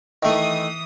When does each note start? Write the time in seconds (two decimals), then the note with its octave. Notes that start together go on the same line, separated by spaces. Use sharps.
0.23 D#3 E3 A3 D#6